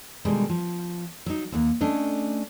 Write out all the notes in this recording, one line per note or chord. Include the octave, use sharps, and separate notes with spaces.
B2 D3 D#3 G3 G#3
F3
F#3 D#4
D#2 A#3 F#5
A3 C#4 D4 D#5